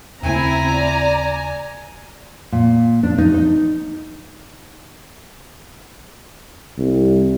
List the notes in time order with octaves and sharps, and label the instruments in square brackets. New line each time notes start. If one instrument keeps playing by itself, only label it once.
[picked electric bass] D#2 C#3 A3 [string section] C4 E4 [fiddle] G#5 [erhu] A#5
[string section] D5
[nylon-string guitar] A#2
D4
D#4
D#4
[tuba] C2